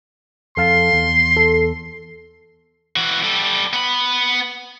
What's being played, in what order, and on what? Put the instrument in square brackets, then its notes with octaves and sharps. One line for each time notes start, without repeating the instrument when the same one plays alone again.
[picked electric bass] F2 [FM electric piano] A4 F5 A5 [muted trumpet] C6
[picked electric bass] E2
[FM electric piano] A4
[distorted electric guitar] E3 F#4
G3 A4
B3 B5